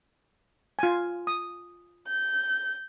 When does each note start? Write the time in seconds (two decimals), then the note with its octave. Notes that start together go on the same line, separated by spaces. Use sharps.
0.79 F4 G#5
1.27 D#6
2.07 G6